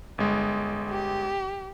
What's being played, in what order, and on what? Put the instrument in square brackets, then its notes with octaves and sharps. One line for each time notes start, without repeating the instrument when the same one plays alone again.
[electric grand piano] G1 G#3
[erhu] G4